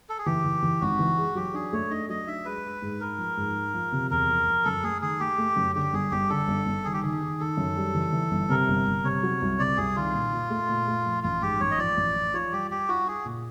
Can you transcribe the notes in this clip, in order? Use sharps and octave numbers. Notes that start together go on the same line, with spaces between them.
A4
G#4
E3 G4
E3
E3
G#1 F#4
E3
G#3
F#3 G4
D4 G#4
A3 C#5
D4 D#5
F#3 D#5
D4 E5
G#3 B4
G#3
G#2
G#3 A#4
F3
G#2
G#3
F3
C3
E2 A#4
F3
F3
F#2 A4
A3 G#4
D#3 G#4
A3 G4
A3
F#2
D3 G4
G1 G#4
G1 G4
D3 A4
G1
G1
D#3 G#4
G4
D#3 G#4
D#3
D#3 A4
F#2
G3
E3
E3
G1
C3 A#4
G1
G1
C3 C#5
F#3
C2
C3 D5
C2 G#4
D#3 F4
A#2
A#2
A3
A#2
A3
F3
A1 F4
G#2 G4
A1 C#5
D#5
F3 D5
A1
F3
F4 C#5
G3 G4
G3 G4
F4 F#4
F4 G#4
A#2